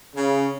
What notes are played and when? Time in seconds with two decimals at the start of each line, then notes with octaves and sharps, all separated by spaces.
0.16 C#3